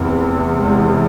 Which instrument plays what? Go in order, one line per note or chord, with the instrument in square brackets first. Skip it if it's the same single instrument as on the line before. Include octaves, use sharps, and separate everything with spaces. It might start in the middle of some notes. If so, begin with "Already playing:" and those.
Already playing: [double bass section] F1 E2 C3 E3
G#3